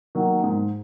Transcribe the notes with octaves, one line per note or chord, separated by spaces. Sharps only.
D#3 F#3 A#3
G#2